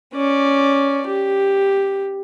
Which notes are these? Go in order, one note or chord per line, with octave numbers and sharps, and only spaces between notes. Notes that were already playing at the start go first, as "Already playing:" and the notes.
C#4 D5
G4